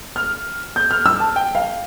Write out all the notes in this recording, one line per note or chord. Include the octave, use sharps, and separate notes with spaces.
F6
G6
F6
E6
A5
G5
F5